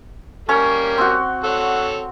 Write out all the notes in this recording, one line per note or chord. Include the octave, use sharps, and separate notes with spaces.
G3 A#3 C#4 A#4 C#5
C4 F#4
A4 C#5 F#5